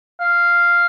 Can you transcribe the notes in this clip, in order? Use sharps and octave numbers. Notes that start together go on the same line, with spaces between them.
F5